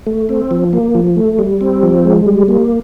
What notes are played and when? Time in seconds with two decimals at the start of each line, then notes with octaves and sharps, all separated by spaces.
0.07 A3
0.29 C4
0.51 F3
0.73 A#3
0.95 F3
1.16 A3
1.39 G3
1.61 C4
1.83 F3
2.05 G#3
2.26 G3
2.48 A#3